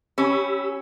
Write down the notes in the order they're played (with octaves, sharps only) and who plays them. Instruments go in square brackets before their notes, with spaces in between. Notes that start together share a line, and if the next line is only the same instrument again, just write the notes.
[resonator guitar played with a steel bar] C#4 [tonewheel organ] G4 B5 E6